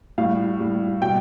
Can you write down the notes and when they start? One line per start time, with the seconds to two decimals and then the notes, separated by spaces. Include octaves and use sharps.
0.18 A2 G3 F5
0.59 A2 G3
1.01 B2 G3 G5